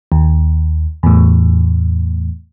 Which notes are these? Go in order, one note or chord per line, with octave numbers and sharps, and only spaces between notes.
D#2
E2 A2